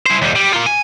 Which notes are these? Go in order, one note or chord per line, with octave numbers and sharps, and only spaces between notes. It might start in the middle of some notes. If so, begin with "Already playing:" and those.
E4 C5
D#2 G3
G3
A#3 F4
G#5